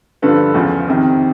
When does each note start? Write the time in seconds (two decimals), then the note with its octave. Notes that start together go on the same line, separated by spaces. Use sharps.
0.22 G2 D3 F3 A4 B4
0.54 E2 C#3 F3
0.88 F2 C3 D#3